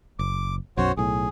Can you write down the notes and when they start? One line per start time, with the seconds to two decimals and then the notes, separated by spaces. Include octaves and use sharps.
0.19 F#1 D6
0.77 B1 F#2 F#4 C5 C#5
0.97 B1 A2 G#4